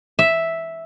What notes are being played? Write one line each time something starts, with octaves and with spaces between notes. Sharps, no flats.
E5